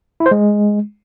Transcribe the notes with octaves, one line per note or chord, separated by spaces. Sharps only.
E4
C5
G#3